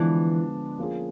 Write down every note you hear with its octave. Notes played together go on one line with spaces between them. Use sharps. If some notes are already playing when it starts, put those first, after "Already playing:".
Already playing: D3 E3 F3 G#3 B3 D4
F3 A#3 C#4 F4 G#4